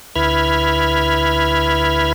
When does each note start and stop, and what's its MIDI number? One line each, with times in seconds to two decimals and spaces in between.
0.15 2.13 38
0.15 2.13 64
0.15 2.13 71
0.15 2.13 83
0.15 2.13 89
0.15 2.13 92